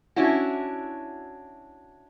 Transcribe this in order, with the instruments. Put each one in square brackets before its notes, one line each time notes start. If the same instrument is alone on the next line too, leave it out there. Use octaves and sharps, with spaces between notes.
[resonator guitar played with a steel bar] C#4 D4 E4 F#4